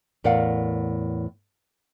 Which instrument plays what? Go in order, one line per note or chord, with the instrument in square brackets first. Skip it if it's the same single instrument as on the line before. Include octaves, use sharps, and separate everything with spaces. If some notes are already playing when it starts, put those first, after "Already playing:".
[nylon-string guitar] E2 A2 A#4 D5 F5 F#5